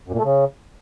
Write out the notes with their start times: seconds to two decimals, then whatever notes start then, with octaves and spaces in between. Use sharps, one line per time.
0.08 F#2
0.13 A#2
0.19 A3
0.24 C#3